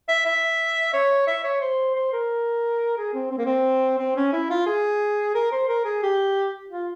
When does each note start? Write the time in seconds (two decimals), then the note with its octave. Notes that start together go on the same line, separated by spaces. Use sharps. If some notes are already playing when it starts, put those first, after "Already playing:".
0.08 E5
0.26 E5
0.93 C#5
1.27 E5
1.44 C#5
1.61 C5
1.95 C5
2.13 A#4
2.97 G#4
3.14 C4
3.31 C4
3.38 A#3
3.45 C4
3.99 C4
4.16 C#4
4.32 E4
4.50 F4
4.66 G#4
5.34 A#4
5.52 C5
5.68 A#4
5.85 G#4
6.03 G4
6.70 F4